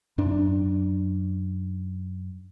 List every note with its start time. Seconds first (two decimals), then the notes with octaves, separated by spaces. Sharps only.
0.18 F#2 D4